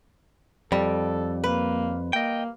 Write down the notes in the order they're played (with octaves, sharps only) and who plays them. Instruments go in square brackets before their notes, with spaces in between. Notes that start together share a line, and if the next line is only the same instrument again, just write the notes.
[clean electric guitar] F2 [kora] G3 [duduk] A4
[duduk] A#3 [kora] B4
[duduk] A#3 [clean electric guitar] D#5 G5